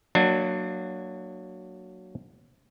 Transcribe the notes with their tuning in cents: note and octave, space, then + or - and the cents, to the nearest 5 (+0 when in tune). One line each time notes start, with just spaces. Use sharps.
F#3 +0 A#3 -10 D4 +30